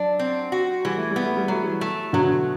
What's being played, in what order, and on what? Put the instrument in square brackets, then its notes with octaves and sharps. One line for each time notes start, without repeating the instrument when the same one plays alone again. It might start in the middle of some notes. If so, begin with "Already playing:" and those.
Already playing: [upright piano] F#3 [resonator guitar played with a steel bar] D4
[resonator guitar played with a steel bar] C4
F#4
[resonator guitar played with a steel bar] E3 [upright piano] G3
[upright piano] A3
G3
[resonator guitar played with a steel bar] B3
[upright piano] A3
G3
[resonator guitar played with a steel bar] F#3 [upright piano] A3
[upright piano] E3 G3
[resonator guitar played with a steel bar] A3
[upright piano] B2 D3 [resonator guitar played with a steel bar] F#3